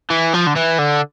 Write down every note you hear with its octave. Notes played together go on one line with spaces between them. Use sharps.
E3
F3
D3
E3
D3